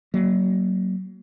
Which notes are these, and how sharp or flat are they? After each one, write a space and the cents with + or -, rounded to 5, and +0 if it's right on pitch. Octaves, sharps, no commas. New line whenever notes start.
F#3 +25 A#3 +0